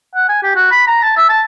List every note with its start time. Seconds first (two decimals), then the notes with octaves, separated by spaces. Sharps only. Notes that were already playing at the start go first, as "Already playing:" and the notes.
0.15 F#5
0.29 G#5
0.43 G4
0.56 F#4
0.71 B5
0.87 A#5
1.03 A5
1.17 E5
1.29 A5